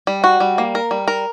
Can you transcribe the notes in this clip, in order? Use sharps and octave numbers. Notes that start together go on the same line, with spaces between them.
G3
F#4
G3
A#3
A#4
G3
A#4